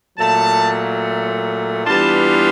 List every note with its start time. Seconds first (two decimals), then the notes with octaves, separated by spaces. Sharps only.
0.18 A#2 F#3 A3 A5
1.85 E3 G3 B3 D4 F4 A5